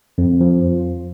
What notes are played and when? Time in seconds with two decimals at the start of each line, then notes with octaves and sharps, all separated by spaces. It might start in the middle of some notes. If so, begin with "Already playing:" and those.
0.18 F2
0.41 F3